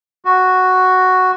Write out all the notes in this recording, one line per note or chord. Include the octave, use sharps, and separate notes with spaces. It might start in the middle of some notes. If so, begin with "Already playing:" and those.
F#4